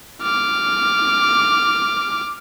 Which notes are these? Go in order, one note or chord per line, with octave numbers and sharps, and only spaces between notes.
D6 F6